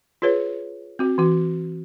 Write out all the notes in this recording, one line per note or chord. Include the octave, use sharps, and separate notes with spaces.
F4 G#4 B4 C#5
C4 F#4
E3 F#4